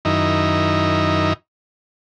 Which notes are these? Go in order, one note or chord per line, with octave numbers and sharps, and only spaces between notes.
F#2 D#3 D#4 E4